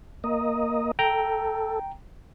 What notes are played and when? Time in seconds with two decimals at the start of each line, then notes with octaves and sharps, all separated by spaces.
0.24 A#3 D#5
0.99 A4 G5 A#5